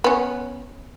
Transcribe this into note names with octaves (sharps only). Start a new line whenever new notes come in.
B3 C#4